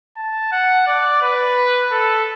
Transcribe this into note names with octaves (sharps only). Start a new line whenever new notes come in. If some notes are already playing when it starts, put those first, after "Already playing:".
A5
F#5
D5
B4
A4